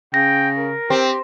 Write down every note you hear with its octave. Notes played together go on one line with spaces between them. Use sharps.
C#3 G5 A#6
A#4
C4 G4